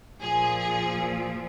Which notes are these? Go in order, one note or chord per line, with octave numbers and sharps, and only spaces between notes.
A#2 F3 G#4
G#4